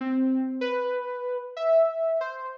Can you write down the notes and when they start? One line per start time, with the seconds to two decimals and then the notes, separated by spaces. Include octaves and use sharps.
0.01 C4
0.61 B4
1.57 E5
2.21 C5